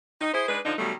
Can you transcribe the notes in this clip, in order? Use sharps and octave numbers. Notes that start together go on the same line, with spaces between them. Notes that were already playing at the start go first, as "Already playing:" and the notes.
D#4
E4 G#4 C5
G#3 D4 D#4 B4
D3 F3 D4 D#4
B2 D#3 F#3 G3 A3